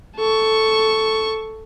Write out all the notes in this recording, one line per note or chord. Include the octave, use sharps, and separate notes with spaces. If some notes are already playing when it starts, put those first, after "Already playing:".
A4 C#6